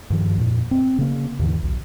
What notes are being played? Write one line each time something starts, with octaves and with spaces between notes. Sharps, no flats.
G2 D#3 F3
F2 A#2
C4
C#3 A#3
D#2 G#2 D3 E3
B1